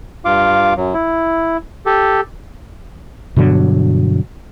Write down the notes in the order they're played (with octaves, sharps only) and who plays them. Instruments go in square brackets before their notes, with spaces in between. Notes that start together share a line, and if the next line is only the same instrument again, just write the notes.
[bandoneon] G2 F4 F5 D6
F#2 F#3
E4
G4 A4
[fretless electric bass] G2 B2 D3 F#3